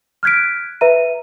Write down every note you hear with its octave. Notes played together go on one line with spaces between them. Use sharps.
F6 F#6 G#6 B6 D7
B4 E5 A#5 D#7